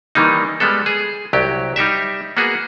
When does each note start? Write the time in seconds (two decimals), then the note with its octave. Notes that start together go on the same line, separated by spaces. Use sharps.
0.15 D#3 E3 G3 A#3 D#4
0.60 G3 G#3 B3 A4
0.86 G#4
1.33 C2 F#3 G4
1.76 G3 D#4 G4 E5
2.37 A#3 B3 F#4 G#4